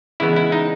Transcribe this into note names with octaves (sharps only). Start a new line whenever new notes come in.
C#3 E3 G#3 B3 E4
E4
D#4